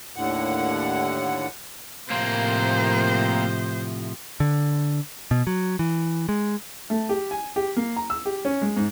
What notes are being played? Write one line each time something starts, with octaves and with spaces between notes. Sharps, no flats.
D#2 A2 D3 F#5
A2 C3 F3 A#3 C4 C5
D3
B2
F#3
E3
G#3
A3
G4
G#5
G4
A#3
A#5
E6
G4
C#4
G#3
G#2